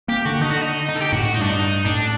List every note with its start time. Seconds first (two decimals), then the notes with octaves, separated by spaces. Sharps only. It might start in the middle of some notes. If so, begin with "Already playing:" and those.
0.08 A#3 G4
0.25 D3 F#4
0.41 D3 D#4
0.51 F#4
0.62 D#4
0.89 D#4
0.96 A4
1.01 G4
1.13 A2 F#4
1.25 F#4
1.34 D#4
1.38 G2
1.43 D4
1.52 D#4
1.85 A2 D4